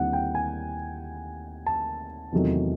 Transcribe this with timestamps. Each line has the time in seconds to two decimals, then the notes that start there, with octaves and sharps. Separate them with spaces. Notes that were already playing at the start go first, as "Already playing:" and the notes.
Already playing: D#2 D3 G3 C4 E4 F#5
0.13 G5
0.35 G#5
1.67 A5
2.32 E2 C3 D#3 F#3 A3